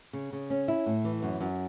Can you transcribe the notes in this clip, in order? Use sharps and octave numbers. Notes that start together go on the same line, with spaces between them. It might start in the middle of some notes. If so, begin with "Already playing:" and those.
C#3
C#3
C#4
E4
A2
E3
F#2
F#2